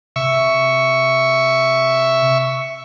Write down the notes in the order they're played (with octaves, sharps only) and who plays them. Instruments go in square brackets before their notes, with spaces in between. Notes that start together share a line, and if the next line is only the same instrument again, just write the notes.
[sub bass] C3 [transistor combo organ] E5 C#6